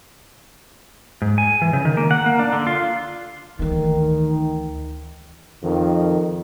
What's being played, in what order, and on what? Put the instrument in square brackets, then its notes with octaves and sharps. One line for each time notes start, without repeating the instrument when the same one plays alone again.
[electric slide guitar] G#2
G#5
E3
C#3
D#3
A#3
F#5
A#3
D4
D3
F4
[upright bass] D2 E3 [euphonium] D#3
[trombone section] F2 D#3